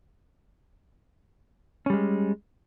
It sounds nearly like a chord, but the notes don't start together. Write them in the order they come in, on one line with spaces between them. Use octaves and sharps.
C#4 G3 G#3